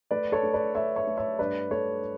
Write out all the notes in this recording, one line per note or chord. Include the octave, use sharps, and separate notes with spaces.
A3 B4 D5
A4 C#5
A3
B4 D5
A3 C#5 E5
C#5 E5
A3
C#5 E5
G2 B4 D5
A3 A4 C#5